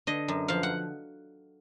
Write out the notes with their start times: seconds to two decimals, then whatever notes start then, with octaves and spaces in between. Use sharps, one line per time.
0.07 D3 D#5
0.28 F#2
0.48 F3 F5
0.63 F#5